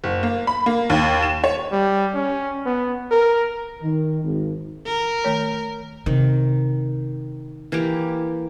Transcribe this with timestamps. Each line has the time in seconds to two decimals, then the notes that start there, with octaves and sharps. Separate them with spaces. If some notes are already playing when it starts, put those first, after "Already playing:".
0.04 F#1
0.23 A#3
0.47 B5
0.66 A#3
0.90 D#2
1.23 E7
1.44 C#5
1.72 G3
2.15 C#4
2.66 B3
3.11 A#4
3.82 D#3
4.24 G#1
4.86 A#4
5.24 D#3 A3 C#5
6.06 C3 D#3
7.72 E3 A#3 G4